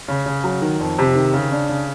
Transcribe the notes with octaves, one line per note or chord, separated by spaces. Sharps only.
C#3
C#3
F#3
D#3
F2
C3
D#3
C#3
D4
C#3